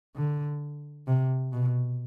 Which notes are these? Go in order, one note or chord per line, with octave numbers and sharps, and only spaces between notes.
D3
C3
B2